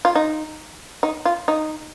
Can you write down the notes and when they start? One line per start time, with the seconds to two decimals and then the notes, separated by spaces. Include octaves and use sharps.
0.05 F4
0.15 D#4
1.03 D#4
1.25 F4
1.48 D#4